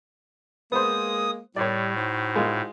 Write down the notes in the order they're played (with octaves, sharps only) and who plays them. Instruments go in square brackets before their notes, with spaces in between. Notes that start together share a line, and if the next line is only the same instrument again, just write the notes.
[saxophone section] G#3 A#3 [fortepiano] B3 C5 [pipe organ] D#6
[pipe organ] A2 [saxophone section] G3 [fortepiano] C#5 D5
[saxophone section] D#4 F#4 C5
[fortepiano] G#3 F4